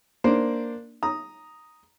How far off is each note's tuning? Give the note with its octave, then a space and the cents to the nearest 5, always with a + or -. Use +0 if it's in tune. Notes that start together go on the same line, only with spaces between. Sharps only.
A#3 +0 D4 +0 C5 +0
A#5 +0 D#6 +0